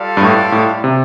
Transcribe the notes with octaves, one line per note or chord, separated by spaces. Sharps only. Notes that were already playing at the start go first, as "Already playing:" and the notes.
Already playing: G3 F4 A4 D5 F5
G2
A2
A2
C3